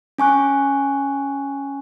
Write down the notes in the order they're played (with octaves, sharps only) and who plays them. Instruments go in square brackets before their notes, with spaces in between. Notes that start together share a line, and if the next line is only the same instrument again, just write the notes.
[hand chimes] C#4 G#5 C#6 F#6